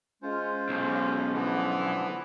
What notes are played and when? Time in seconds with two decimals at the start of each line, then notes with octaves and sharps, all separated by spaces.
0.23 G#3 C#4 F4 C5
0.69 B1 F2
1.34 D3 E3 F3 B3